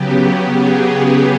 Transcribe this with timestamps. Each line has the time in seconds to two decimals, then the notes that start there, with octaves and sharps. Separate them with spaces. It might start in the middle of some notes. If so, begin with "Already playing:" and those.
Already playing: C#3 F#3 B3 G4
0.54 G#4